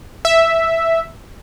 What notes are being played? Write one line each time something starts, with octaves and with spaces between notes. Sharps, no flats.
E5